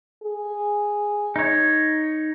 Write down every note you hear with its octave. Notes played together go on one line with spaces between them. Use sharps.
G#4
D#4 C#5